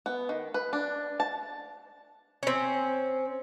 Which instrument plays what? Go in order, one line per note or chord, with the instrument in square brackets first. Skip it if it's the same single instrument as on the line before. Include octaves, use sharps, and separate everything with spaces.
[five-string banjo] B3
D#3
B4
D4
A5
[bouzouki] C4 C#4